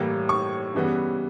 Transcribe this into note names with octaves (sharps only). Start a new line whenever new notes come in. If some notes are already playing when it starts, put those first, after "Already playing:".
Already playing: A2 E3 G3 A#3
C#6
C#3 E3 G3 B3